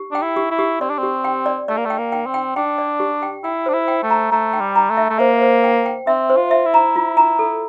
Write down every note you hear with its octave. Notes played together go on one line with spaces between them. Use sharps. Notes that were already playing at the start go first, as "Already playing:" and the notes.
Already playing: G4
D4 G5
E4
G4
E4
G4
C4 D5
D4
C4 G4
G5
D5
A3 D5
A#3
A3 G5
A#3
G5
C4
G5
D4 G5
D5
G4
G5
E4 G5
D4 C5
E4
G5
A3
A#5
A3 A#5
G5
G3
A#5
A3
E5
A3
A#3 C5
C5
G5
G5
C4 E5
C5
F4
E5
E4
A#5
F4
A#5
A4